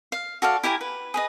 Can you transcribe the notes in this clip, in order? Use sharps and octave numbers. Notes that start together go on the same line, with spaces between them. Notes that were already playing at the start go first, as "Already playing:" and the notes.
F5
F#4 A4 D5 F5
E4 G4 G#5 A#5
B4
G#4 B4 D#5